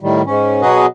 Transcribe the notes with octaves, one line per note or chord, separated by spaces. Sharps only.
A2 D#3 G3
G#2 C#4
B2 F#3 F#4 G#4 B4 D#5